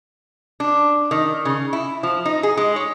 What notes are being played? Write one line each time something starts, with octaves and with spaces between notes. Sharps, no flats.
D4
D#3
C#3
E4
F3
D#4
G#4
G#3
C#5